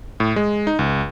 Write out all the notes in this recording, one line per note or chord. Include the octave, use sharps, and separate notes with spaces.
A2
G#3
D#4
C#2